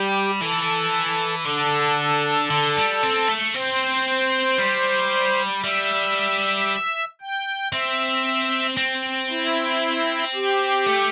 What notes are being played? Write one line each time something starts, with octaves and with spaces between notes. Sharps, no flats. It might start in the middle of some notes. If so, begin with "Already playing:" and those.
Already playing: G3 G4
E3 A4
D3 A4
D3
G3
C4
A3
C4 C5
G3
G3 E5
G5
C4 E5
C4
E4
G4
A3